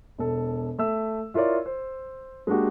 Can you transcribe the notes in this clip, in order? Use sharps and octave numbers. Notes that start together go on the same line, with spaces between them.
E1 A4
A3 E5 E6
E4 F4 A#4 C#5 D5
C5
G#3 A#3 D4 F#4 G4